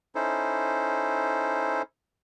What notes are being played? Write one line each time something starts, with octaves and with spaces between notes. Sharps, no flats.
C#4 D#4 E4 A4 C5